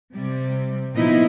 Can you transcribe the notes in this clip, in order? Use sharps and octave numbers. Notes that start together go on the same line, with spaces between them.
C3 G3
A#2 F3 B3 D#4 E4 D#5